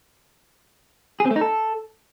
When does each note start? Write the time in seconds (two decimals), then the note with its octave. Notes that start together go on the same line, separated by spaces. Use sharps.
1.20 G#4
1.25 C4
1.31 A3
1.36 D#4
1.41 A4